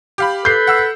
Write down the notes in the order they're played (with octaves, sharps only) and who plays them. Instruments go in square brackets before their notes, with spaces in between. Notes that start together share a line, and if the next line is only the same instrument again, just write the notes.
[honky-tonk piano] G4 F5 B5
[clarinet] A4 [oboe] B4 [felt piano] G6 C7
[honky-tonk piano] F#5 E6